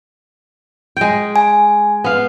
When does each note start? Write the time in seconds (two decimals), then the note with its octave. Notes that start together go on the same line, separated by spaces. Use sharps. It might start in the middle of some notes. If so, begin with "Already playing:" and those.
0.97 G#3 G5
1.36 G#5
2.04 B3 F5